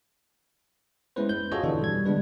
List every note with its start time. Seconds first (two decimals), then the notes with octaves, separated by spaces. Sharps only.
1.16 G#3 B3 C#4 E4 B4 C5
1.29 G6
1.52 F4 F#4 G#4 A4 C#5 D#5
1.63 B2 D3 E3 D4 A4
1.82 G3 G#6
2.06 D3 G3 G#3 B3 D4 B4